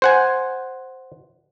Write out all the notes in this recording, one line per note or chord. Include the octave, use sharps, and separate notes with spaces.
C5 F#5 G#5